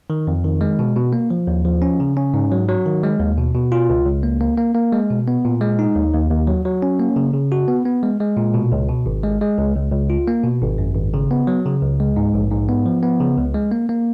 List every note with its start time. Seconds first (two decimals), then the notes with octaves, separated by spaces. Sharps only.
0.10 D#3
0.27 F2
0.44 D#3
0.61 G#3
0.79 B2
0.96 B2
1.13 A#3
1.30 F3
1.47 D#2
1.65 F3
1.82 C#4
2.00 C#3
2.17 C#4
2.34 G#2
2.52 F#3
2.68 F#3
2.86 D#3
3.03 G#3
3.20 D#2
3.38 B2
3.55 B2
3.72 F4
3.90 C#2
4.06 C#2
4.23 A#3
4.41 A#3
4.58 A#3
4.75 A#3
4.93 G#3
5.10 B2
5.28 B3
5.45 A#2
5.61 G#3
5.79 D#4
5.96 D#2
6.13 D#2
6.31 D#2
6.47 F#3
6.65 F#3
6.82 C#4
6.99 A#3
7.16 C#3
7.34 C#3
7.52 F#4
7.68 B3
7.86 B3
8.03 G#3
8.20 G#3
8.37 A#2
8.54 B2
8.72 C#2
8.89 B2
9.06 G#1
9.23 G#3
9.41 G#3
9.58 C#2
9.75 C#2
9.92 C#2
10.10 F4
10.28 A#3
10.44 B2
10.62 G#1
10.78 F#2
10.96 G#1
11.14 C#3
11.31 B3
11.47 F#3
11.65 C#3
11.82 C#2
12.00 G#3
12.16 G#2
12.34 A#1
12.52 G#2
12.69 B3
12.86 F3
13.03 B3
13.20 C#3
13.38 C#2
13.55 G#3
13.71 A#3
13.89 A#3